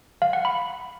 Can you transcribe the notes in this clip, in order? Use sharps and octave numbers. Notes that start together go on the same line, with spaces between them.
F5
F#5
B5